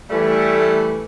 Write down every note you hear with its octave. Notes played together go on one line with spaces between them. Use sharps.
E3 G3 A3